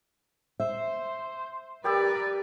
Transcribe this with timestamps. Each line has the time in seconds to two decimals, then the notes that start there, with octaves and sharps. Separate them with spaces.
0.60 C5 E5
1.84 G3 G4 A#4 B4 D5 E6